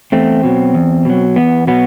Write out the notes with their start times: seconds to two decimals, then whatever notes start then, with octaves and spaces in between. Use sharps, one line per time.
0.12 E2 A3 C4
0.43 B2 F#3
0.74 E2
1.05 B2 F#3
1.36 E2 B3
1.67 B2 F#3 B3